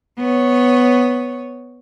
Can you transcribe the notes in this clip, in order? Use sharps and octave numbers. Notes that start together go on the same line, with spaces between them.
B3 C#5